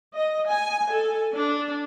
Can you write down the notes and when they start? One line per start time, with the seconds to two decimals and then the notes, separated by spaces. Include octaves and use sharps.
0.16 D#5
0.51 G#5
0.92 A4
1.34 D4